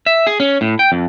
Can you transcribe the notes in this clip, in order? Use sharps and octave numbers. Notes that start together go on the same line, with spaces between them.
E5
G#4
C#4
A2
G5
F2